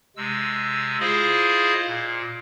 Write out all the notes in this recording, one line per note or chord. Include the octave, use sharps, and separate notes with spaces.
C3 G#3 E6
E4 F4 G#4 C5 D#5 F5
A#2